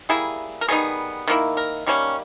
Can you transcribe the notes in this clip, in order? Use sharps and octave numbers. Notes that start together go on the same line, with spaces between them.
G3 A#3 E4 G#4
A#4
D#3 G3 B3 D#4 G#4
D#3 A#3 E4
A#4
D#3 G3 A#3 C#4